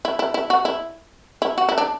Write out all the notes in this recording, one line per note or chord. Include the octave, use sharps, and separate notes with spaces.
E4
E4
E4
F#4
E4
E4
F#4
E4
D4